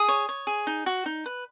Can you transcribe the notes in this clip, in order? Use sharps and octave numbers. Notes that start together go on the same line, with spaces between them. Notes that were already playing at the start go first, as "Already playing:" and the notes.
Already playing: G#4 D#6
C#5
C#5
G#4
D#4
F#4
D#4
B4